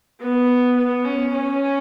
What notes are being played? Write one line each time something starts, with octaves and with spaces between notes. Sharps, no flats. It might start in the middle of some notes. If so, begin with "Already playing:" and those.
B3
B3
C#4
C#4